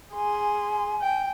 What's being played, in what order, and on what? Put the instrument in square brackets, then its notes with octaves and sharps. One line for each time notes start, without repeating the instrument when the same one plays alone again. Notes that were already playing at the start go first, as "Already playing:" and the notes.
[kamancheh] G#4 C6 [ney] G#5
[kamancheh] G5